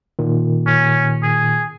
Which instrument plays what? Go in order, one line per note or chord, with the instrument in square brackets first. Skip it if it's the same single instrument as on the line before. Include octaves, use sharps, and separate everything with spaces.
[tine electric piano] A#2 D#3
[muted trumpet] C#4
G#4